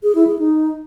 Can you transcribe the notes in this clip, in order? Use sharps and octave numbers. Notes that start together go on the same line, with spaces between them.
G#4
E4
G#4
D#4